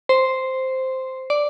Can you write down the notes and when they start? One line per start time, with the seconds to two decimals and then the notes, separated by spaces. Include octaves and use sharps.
0.09 C5
1.30 D5